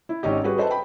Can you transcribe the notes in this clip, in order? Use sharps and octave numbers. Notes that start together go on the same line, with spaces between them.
E4
G#1 C#4 D#4 G4
G3 F#4 G#4 B4
A4 B4 C5 D#5 E5 A5
G5 B5